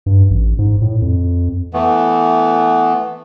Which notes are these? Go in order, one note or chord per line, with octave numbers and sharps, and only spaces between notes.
G2
A1
G#2
A2
F2
E3 A3 B3